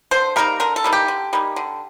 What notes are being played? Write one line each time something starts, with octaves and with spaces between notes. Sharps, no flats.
D3 C5
G3 A#3 D#4 A#4
D3 A#4
A4
G3 A#3 D#4
G4
D3
G3 A#3 D#4
D3